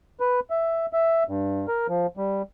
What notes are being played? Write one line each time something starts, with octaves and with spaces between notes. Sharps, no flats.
B4
E5
E5
G2
A#4
F3
G3